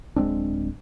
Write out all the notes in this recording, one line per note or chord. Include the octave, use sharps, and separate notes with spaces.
D1 G#3 C4 D4